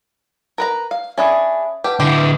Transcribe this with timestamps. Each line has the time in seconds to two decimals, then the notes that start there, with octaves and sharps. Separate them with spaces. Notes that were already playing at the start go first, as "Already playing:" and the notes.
0.58 A#4 B4 A#5
0.91 F5
1.18 C#4 D4 G#4 E5 B5 D#6
1.84 G4 B4 F#5 A5
2.00 D3 E4 G4
2.15 B4 D#6